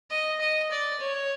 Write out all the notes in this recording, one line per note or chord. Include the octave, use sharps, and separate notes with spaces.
D#5
D#5
D5
C#5